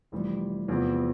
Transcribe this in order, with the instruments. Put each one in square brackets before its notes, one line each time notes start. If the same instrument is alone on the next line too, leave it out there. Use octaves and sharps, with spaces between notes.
[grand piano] F1 F2 E3 G3
E2 C3 F3 B3